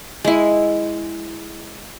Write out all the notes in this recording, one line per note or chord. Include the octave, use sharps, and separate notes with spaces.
G#3 E4